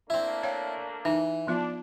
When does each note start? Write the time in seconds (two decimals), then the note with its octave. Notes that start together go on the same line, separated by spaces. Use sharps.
0.10 A3 A#3 C4 D4 E4
0.43 C#5 F5 G5
1.05 E3 D#4
1.47 F3 B3 D4 F4